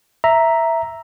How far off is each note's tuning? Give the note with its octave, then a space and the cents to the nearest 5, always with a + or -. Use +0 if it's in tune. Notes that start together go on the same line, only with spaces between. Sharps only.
E5 +0 A#5 +0